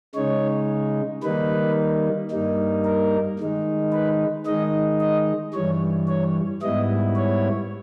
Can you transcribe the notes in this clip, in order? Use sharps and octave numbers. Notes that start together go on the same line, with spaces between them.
C#3 G#3 D#4 C#5
D#3 G3 A#3 D#4 B4
G2 G3 A#3 D#4
A#4
D#3 G#3 D#4
B4
D#3 G#3 D#4 D#5
D#5
G2 E3 G3 C#5
C#5
G#2 G3 B3 E4 D#5
C#5